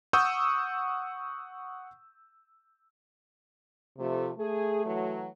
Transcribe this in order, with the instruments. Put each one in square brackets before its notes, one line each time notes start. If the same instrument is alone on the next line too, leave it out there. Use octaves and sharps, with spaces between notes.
[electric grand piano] F#5 C#6 D#6 E6 G6
[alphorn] C3 [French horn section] F3 A3
[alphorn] A3 [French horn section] G#4
[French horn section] E3 F#3